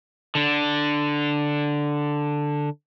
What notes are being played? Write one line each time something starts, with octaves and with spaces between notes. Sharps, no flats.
D3 D4